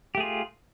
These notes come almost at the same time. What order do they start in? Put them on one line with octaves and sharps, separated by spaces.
G4 A3 G#4 F4